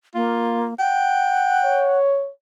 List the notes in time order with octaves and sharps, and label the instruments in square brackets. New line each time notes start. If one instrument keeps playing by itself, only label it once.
[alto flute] A#3 [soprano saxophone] F4
[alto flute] F#5 [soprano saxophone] G5
[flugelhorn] C#5